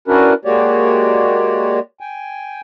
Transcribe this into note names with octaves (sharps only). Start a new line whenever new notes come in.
C#4 D4 E4 F#4 A#4 B4
G#3 A#3 F#4 G4 C#5 D5
G5 G#5